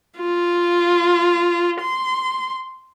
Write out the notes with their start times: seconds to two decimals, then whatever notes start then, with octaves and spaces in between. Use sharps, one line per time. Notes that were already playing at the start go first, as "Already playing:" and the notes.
0.17 F4
1.80 C6